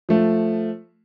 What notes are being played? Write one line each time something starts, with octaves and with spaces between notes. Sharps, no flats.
F3 A3